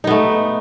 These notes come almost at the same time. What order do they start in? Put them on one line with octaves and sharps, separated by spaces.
D#4 B3 A3